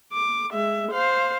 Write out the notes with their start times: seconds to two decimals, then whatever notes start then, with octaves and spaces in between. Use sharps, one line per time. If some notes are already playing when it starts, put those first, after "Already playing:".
0.13 D6
0.53 G#3 E5
0.92 C5 F5